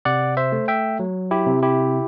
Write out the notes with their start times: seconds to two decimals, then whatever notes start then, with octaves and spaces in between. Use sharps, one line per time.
0.05 C3 D5 F#5
0.37 C5 E5
0.52 A3
0.68 E5 G5
0.99 F#3
1.31 E4 G4
1.47 C3
1.62 E4 G4